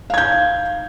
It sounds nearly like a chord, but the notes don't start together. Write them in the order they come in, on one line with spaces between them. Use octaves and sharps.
F5 G#6 G6